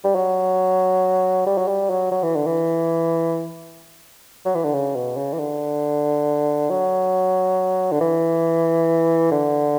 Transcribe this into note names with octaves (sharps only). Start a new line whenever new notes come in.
G3
F#3
G3
F#3
G3
F#3
F#3
E3
D3
E3
F#3
E3
D3
C#3
B2
C#3
E3
D3
F#3
D3
E3
D3